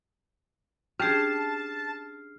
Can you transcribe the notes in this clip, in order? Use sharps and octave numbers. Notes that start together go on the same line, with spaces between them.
C#4 D4 G4 G#4 A5 F6 C7